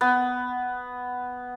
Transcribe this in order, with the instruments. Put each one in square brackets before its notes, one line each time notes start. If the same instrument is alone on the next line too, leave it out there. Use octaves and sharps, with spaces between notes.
[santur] B3